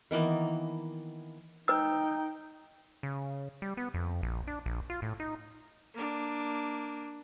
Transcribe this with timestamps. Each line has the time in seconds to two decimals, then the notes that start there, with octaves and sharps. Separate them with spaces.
0.11 D#3 E3 A#3 B3
1.68 D#4 B4 G5 E6
3.03 C#3
3.62 G3
3.77 B3
3.94 F2
4.23 A#1
4.47 D4
4.66 A#1
4.90 F4
5.02 A2
5.20 D#4
5.94 A#3 D4